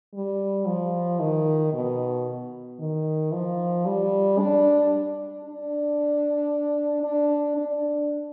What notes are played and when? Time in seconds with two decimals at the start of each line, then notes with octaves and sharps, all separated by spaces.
0.14 G3
0.67 F3
1.19 D#3
1.73 B2
2.79 D#3
3.32 F3
3.86 G3
4.38 D4
5.45 D4
7.03 D4
7.57 D4